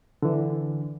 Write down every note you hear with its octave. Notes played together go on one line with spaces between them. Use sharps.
D3 E3